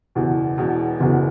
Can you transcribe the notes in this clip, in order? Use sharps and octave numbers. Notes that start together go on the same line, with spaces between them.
F#1 E2 B2
E1 E2 B2
F#1 E2 B2